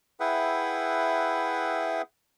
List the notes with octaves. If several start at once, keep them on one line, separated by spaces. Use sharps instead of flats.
E4 G#4 B4 E5 F#5 G5